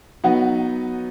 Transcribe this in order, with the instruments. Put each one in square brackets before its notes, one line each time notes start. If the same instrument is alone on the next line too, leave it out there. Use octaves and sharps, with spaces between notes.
[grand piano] F#3 B3 D#4 F#4